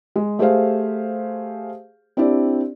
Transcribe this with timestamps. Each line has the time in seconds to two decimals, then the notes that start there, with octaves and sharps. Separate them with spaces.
0.16 G#3
0.39 A3 G4 G#4 C5 F5
2.17 C4 D4 E4 G4 D5